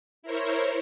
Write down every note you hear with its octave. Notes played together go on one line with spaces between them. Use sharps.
E4 A#4 C5 C#5